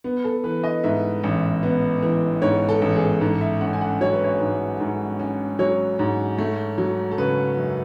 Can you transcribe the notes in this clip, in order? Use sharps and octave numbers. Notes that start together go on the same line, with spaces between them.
B3
A4
E3 B4
D#5
G#2 E5
A1
B3
E3
G#2 C#5
A4
A1
G#4
G#2 A4
E5
C#4 F#5
G#5
F#5
F#3 C#5
B4
C#5
G#2
G#2
C#4
F#3 C#5
G#2
A3
F#3
A4
C#3 B4
F#2